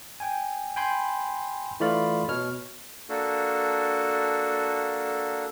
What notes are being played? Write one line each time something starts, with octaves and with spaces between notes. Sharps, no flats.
G5 G#5
G5 G#5 B5 C6 G6
E3 A3 F4 D5 B5 F6
B2 C#5 F6
A#3 D4 F#4 A4